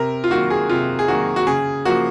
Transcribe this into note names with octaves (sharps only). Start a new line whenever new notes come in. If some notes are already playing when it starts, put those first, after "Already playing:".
Already playing: C3 A#4
F4
D#3 F#3 A#3 F#4
G#4
C3 F4
G#4
D#3 F#3 A#3 F#4
F#4
C#3 G#4
F3 A#3 F#4